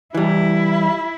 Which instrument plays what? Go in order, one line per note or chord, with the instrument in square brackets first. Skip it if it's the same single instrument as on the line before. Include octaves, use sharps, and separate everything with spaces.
[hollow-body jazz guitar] E3 G3 [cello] E4